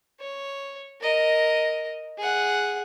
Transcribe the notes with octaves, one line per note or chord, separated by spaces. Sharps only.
C#5
A#4 D#5
G#4 F#5